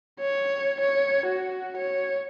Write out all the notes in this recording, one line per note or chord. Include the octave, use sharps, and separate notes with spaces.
C#5
C#5
F#4
C#5